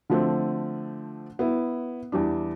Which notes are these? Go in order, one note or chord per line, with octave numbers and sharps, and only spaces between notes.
D3 F3 A3 C4
B3 E4
E2 G3 D4